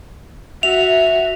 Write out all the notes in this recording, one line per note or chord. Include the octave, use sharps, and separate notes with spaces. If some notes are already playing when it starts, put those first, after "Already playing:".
F#4 E5 F7